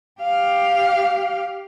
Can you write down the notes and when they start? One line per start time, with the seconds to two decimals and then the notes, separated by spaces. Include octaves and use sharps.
0.21 G4 F5